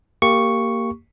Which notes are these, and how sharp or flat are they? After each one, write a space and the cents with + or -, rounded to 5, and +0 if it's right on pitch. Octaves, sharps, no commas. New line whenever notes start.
A#3 -15 G4 +0 C#6 +0